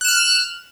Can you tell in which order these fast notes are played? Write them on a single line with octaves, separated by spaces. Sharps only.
F#6 E7 F6